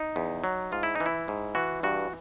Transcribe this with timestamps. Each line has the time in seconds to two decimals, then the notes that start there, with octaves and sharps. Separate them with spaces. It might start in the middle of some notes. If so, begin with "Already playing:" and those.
Already playing: D#4
0.16 E2
0.44 F#3
0.72 G#2 F4
0.83 E4
0.95 E3 D#4
1.06 E4
1.28 G#2
1.55 E3 F#4
1.83 G2 F#4